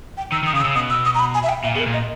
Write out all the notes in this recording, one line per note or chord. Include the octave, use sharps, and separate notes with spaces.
G5
D#3 E6
D#3 D#6
C#3 D#6
E6
C#3
B2 D#6
E6
D#6
A#5
B5
G#5
E5
G5
A#2 E5
B2 G#4
A#4
A#2
D#5